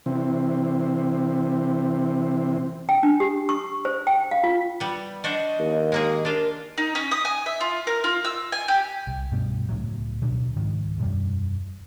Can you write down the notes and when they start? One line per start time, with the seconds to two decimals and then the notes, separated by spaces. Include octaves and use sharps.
0.06 C3 E3 C4
2.89 G5
3.03 D4
3.20 G4
3.49 C#6
3.85 C5
4.07 G5
4.31 F5
4.44 F4
4.80 G3 B3
5.24 D4 F#4 C5 D#5
5.59 D#2
5.92 G#3 A#3 G#4
6.25 D4 F4 A#4
6.78 D#4
6.95 C#4
7.11 D#6
7.25 G#5
7.46 E5
7.61 F4
7.87 A#4
8.04 F4
8.25 E6
8.52 G#5
8.68 G4
9.07 C2
9.32 G2 B2
9.69 C#2 A2 F#3
10.22 D2 B2 D3 F#3
10.56 C#2 G#2 D#3
10.98 E1 F#2 G3